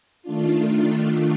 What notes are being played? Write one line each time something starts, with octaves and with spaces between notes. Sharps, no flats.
D#3 A3 D4 F4